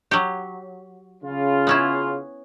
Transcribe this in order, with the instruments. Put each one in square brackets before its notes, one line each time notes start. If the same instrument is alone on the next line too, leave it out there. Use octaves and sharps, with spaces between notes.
[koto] F#3 G4
[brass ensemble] C#3 F4
[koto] B3 C#4 E4